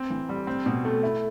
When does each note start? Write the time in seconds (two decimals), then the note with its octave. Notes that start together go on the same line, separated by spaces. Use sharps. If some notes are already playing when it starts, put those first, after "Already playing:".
Already playing: C4
0.10 E3
0.29 G3
0.47 C4
0.66 B2
0.85 A3
1.03 E4